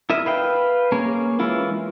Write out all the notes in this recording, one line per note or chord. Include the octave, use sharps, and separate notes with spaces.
E4 A#4 D#5 E5
B4 F5 G5
A#3 C#4 G#4
E3 G#3 C#4 E4 F4